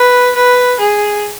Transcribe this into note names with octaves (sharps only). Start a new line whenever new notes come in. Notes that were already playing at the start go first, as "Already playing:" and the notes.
Already playing: B4
B4
G#4